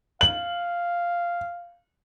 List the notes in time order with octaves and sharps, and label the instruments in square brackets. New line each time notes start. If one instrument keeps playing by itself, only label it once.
[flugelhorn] F5 [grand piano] F#7